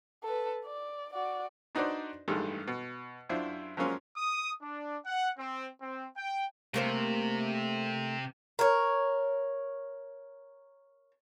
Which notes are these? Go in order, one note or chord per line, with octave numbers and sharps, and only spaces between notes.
A4 B4
D5
F#4 D5
D4 D#4 F#4 B4 C5 D5
A1 G2 D#3 G3 G#3 A4
B2
F#2 D4 E4 F4 C5
F3 F#3 G#3 A#3 C#4 F4
D#6
D4
F#5
C4
C4
G5
C3 A3 A#3 C5
A#4 C#5